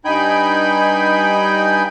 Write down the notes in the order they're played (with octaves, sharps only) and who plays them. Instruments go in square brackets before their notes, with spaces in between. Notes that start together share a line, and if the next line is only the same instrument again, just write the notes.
[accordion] G2 D#4 G5 G#5 B5 G6